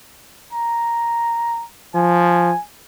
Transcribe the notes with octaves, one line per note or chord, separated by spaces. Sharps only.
A#5
F3 G#5